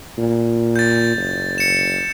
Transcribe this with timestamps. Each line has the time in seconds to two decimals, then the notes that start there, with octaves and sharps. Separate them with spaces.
0.18 A#2
0.76 G6 A6
1.16 F#1
1.58 C#7 E7